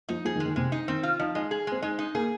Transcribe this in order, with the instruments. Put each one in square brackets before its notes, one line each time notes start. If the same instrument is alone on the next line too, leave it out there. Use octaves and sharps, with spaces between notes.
[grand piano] F3 [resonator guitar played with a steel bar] D#4
[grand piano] F3 [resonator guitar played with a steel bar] G#4
[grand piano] D#3
[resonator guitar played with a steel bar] G#3
[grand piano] D#3
[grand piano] C3 [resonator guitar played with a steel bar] G#3
[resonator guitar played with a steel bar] D#4
[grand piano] D#3 [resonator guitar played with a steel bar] C4
[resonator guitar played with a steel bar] F4
[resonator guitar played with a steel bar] F3 [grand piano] D#4
[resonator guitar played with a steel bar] G#3 [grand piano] D#4
[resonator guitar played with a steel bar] G#4
[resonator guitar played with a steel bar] G#3 [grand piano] C4
[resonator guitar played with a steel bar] G#3 [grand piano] D#4
[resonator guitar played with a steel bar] D#4
[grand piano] A#3 [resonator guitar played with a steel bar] G#4